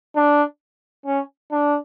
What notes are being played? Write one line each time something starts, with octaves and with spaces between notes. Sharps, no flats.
D4
C#4
D4